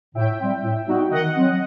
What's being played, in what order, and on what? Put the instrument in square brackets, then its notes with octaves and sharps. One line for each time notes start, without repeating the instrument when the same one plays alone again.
[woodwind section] A2 [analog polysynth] E5 G5
[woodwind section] G3 C4
A2
G3 B3 D#4 F#4
[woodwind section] D#3 [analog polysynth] D#5 F#5
[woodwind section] F#3 C4